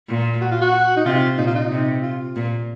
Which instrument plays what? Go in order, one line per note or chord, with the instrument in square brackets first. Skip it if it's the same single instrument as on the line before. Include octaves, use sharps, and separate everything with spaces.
[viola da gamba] A#2
[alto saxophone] F#4
F4
F#4
D#4
[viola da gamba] C3 [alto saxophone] F4
[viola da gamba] A#2 [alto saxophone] D#4
[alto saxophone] F4
D#4
[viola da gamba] C3
[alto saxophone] F4
[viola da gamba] A#2